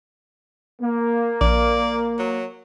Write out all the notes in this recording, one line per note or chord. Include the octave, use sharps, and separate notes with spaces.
A#3
A#1 D5
F#3